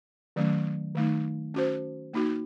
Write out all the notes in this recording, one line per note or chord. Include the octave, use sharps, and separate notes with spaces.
D#3 F#3 A3 C#4
D#3 A3 D#4
C#4 F#4 C5
A#3 D#4 F#4